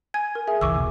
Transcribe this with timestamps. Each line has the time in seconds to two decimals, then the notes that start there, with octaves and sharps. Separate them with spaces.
0.14 G#5 G#6
0.35 A#4
0.47 G#4 E5 G#5
0.61 F#1 C2 E3 C#6 D6 E6
0.76 E1 B2